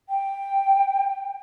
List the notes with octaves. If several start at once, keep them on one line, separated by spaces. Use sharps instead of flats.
G5